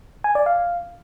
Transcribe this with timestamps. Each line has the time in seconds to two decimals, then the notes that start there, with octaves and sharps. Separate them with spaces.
0.24 G#5
0.35 D5
0.46 F5